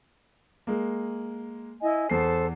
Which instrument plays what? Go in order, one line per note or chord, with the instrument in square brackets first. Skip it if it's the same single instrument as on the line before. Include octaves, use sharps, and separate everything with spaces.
[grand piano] G#3 A#3
[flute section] E4 D#5 G#5
[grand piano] E2 C7 [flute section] A4 C5